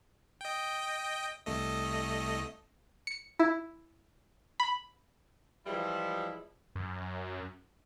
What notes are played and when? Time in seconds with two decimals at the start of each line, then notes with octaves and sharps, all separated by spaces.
0.41 D#5 G5
1.46 C2 A3 D#5
3.07 C#7
3.39 E4
4.60 B5
5.67 E3 F3 G3 G#3 E4
6.75 F#2